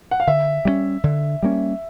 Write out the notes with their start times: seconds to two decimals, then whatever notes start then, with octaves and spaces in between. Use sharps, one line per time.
0.11 F#5
0.20 F5
0.27 D3 E5
0.65 G3 A#3 C#4
1.04 D3
1.43 G3 A#3 C#4